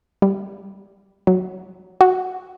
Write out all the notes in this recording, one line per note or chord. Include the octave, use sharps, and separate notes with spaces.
G3
F#3
F#4